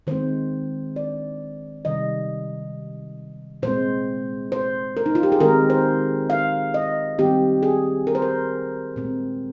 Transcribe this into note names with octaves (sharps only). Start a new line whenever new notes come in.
D#3 G#3 C4 C5
D5
C3 D#3 G3 D#5
A#2 G#3 C4 C5
C5
A#4
D#4
F4
G4
G#4
D#3 G#3 C4 A#4
C5
F5
D#5
D#3 G3 C4 G4
G#4
A#4
C5
A#4
A#2 G#3 C4